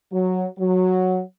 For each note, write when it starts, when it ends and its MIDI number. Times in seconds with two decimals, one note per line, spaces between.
0.12 0.45 54
0.58 1.20 54